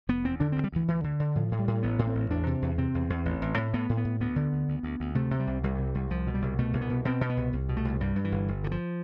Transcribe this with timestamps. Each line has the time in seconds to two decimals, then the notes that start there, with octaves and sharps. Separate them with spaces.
0.09 F1 B3
0.24 E2 C4
0.40 D3 D4
0.52 D2 C4
0.64 G3
0.72 D2 E3
0.88 D2 E3
1.04 D3
1.20 D3
1.35 A2 F3
1.51 A2
1.59 G3
1.68 A2
1.83 A1 B3
1.99 A2
2.07 C4
2.15 A1
2.30 E2 D4
2.47 C3
2.62 E2
2.78 C3 C4
2.94 E2
3.10 E2
3.25 A1
3.42 A1
3.58 A2
3.74 A2 B3
3.89 A2
3.97 B3
4.05 A2
4.20 D2 B3
4.36 D3
4.53 D2
4.68 D2
4.83 D2
5.00 D2
5.15 C3 A3
5.31 C3
5.39 G3
5.47 C2
5.63 C2 G3
5.79 C3
5.95 C2
6.10 C2 F3
6.27 B2
6.34 G3
6.42 C2
6.59 B2 A3
6.73 C2
6.81 B3
6.90 B2
7.05 B2 C4
7.21 B2
7.29 B3
7.37 C2
7.53 C2
7.69 B2
7.77 A3
7.85 C2
8.00 G2 G3
8.16 G2
8.25 E3
8.32 G1
8.48 G1
8.64 D3
8.71 F3